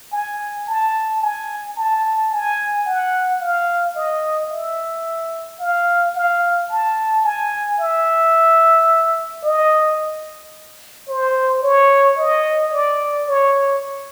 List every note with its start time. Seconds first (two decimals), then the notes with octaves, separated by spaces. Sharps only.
0.13 G#5
0.68 A5
1.22 G#5
1.77 A5
2.31 G#5
2.86 F#5
3.41 F5
3.96 D#5
4.51 E5
5.60 F5
6.15 F5
6.70 A5
7.25 G#5
7.80 E5
9.44 D#5
11.09 C5
11.63 C#5
12.18 D#5
12.73 D5
13.28 C#5